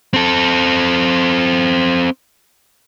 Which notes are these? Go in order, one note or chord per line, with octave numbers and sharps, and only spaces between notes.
C4 A4